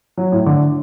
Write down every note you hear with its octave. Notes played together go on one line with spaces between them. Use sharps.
F#3
A2
D3